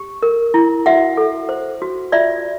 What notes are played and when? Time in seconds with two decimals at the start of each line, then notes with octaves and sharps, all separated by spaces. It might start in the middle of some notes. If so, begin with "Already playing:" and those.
Already playing: G4
0.23 A#4
0.54 E4
0.86 F#4 E5 F#5
1.17 A4
1.49 C5
1.82 F#4
2.12 F4 D5 E5